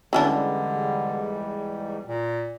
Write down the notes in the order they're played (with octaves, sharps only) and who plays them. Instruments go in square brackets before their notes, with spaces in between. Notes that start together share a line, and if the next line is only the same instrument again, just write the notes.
[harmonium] E2 G#2 G3 [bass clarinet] D3 [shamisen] E3 C#4 D4
[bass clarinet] A#2